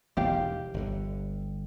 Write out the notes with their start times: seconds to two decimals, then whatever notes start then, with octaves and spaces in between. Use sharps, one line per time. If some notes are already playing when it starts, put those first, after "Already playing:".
0.17 E1 E2 G#2 G4 F5
0.74 G1 D3